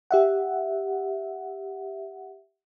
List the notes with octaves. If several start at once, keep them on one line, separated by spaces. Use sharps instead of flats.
G4 E5 F#5